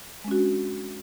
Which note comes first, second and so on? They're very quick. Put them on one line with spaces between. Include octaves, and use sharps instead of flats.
G#3 C#4 F#4 D4